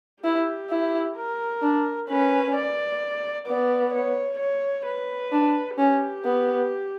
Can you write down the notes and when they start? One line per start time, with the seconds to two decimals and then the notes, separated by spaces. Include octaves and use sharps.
0.24 E4 G4
0.70 E4
1.16 A#4
1.62 D4
2.09 C#4 B4
2.56 D5
3.47 B3 D5
3.94 C#5
4.40 C#5
4.86 B4
5.32 D4
5.78 C#4 G4
6.25 B3